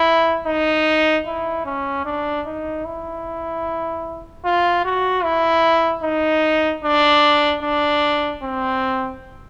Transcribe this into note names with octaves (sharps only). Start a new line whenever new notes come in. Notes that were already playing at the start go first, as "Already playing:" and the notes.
Already playing: E4
D#4
E4
C#4
D4
D#4
E4
F4
F#4
E4
D#4
D4
D4
C4